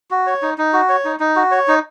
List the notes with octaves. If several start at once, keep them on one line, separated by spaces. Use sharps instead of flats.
F#4
C#5
D#4
D#4
F#4
C#5
D#4
D#4
F#4
C#5
D#4